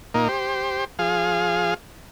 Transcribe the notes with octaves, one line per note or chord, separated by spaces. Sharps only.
A#2 A#3 D#4
G4 C5
F3 G#4 F5